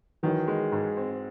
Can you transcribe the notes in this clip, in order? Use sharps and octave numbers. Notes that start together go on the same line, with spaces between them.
D#3 E3 F#3
G#3
G#2
C4